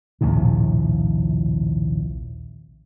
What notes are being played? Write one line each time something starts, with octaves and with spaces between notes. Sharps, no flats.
A#1 D#2 A2 C3